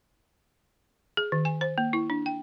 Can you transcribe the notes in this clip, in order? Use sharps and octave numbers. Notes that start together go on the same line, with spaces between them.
G#4
D#3
G#5
C5
A#3
E4
D4
G5